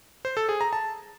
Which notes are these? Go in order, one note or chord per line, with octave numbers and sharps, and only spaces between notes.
C5
A4
G#4
A#5
A5